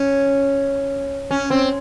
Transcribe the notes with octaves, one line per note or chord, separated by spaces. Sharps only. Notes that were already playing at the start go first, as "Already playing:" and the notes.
Already playing: C#4
C#4
C4